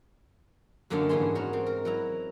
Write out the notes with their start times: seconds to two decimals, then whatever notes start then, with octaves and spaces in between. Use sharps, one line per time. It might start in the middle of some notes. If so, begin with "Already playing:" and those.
0.90 F#2 D3 A#3 C#4 D#4 A5
1.09 G#2 E3 G3 B3 G#4 C6
1.35 D#4 F#4 A#4 C#5
1.53 C4
1.66 A#4
1.85 F#3 E4 A#5